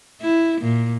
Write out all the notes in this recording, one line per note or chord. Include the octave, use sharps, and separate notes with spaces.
E4
A#2